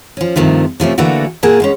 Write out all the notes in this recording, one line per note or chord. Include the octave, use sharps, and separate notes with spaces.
F3 C#4
G2 C3 D#3 F3 A3
C3 F3 A3 C#4
D3 E3 A3 A#3 F#4
A#2 A#3 G#4 A#4 F#5 A5
D#3 G#3 C#4